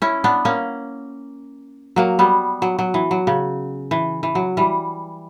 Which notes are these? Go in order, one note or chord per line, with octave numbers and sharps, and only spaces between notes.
C#4 E4
B3 D4
A#3 C#4
F#3 A#3
G3 B3
F#3
F#3
E3
F#3
C#3
E3
E3
F#3
E3 G3